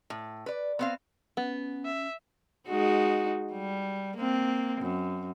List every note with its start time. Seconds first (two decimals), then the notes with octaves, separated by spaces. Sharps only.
0.10 A2
0.46 B4 D5
0.79 B3 C4 F5
1.37 B3 C#4
1.85 E5
2.68 G#3 D#4 F#4
3.53 G3
4.17 A#3 C4
4.80 F#2